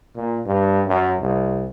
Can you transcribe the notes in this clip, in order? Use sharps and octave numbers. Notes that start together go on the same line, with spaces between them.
A#2
G2
F#2
C2